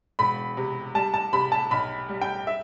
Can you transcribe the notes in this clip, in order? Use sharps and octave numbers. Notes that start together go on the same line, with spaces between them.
E1 B5
C3
G3 A5
A5
C3 B5
A5
B1 B5
G3
G5
E5